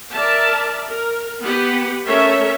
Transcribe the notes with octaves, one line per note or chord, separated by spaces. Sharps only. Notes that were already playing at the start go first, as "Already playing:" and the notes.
A#4 D5 E5 A5
A#4
B3 G4 B4 F#5
A3 C#4 A4 A#4 C#5 E5